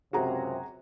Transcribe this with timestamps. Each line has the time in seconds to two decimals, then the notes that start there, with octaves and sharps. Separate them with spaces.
0.13 C#2 F#2 C3 F#4 G#4 A#5